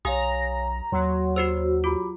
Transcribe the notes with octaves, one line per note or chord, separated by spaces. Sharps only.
B1 G4 C#5 F5 G#5 A#5 D#6
D#2 F#3 C#5 C6
F#4 G4 C5 E6
F4 G4 B5 D6